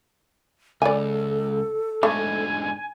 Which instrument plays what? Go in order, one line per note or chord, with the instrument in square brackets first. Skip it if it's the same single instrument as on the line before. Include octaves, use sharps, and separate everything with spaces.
[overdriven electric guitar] C#2 [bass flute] A4 [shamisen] D5 G#5
[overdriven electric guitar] G#2 D3 [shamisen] A3 [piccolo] G#5